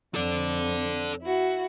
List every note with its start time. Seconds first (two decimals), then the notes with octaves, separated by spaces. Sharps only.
0.14 F2 A4 D5
1.21 E4 F#4